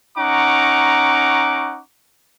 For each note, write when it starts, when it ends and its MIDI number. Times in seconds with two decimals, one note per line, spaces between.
0.18 1.81 61
0.18 1.81 63
0.18 1.81 78
0.18 1.81 82
0.18 1.81 85
0.18 1.81 86